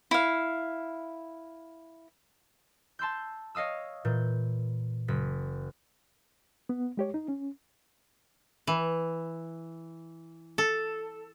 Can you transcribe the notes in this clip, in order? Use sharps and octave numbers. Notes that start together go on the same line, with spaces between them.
E4 F5
A5 C6 E6 G6
C#5 D#5 F5 D#6 E6
A#2 E3 G6
F#1 B6
B3
G#3 G4 C#5
D#4
C#4
E3
A4